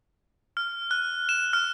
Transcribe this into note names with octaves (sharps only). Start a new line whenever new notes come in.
F6
F#6
E7
F6